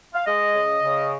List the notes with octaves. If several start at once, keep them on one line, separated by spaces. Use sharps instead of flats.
F5
G#3 D#5
C#3
C#3